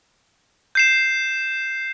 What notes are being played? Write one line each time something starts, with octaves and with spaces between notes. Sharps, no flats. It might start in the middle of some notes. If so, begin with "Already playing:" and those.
G6 C7 E7